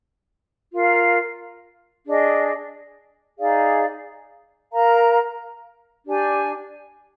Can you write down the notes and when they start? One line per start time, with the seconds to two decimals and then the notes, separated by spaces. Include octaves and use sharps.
0.71 F4 A#4 F5
2.05 D4 G#4 D#5
3.38 D#4 G#4 D5 F5
4.71 A#4 F5 A#5
6.05 D4 G4 D5 G#5